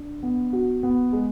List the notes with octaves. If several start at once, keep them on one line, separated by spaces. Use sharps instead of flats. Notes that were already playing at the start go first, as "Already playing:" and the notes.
Already playing: D4
B3
F#4
B3
G#3